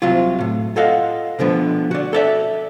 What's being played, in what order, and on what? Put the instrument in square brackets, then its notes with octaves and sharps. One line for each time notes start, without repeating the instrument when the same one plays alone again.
[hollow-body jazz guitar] C2 C3 F#3 F4
A2
F4 A4 D#5 F5 F#5
B2 D3 F3 B3
F#4 D5
A4 D5 E5